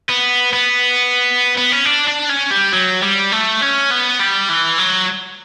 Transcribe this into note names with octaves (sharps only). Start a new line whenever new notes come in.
B3
B3
B3
C#4
D4
D4
C#4
G3
F#3
G3
A3
C#4
B3
G3
E3
F#3